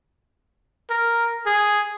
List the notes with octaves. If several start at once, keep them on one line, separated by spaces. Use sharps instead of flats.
A#4
G#4